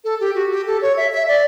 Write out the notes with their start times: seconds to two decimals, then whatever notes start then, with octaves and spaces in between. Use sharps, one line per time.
0.04 A4
0.20 G4
0.35 F#4
0.51 G4
0.67 A4
0.82 C#5
0.97 E5
1.12 E5
1.28 D5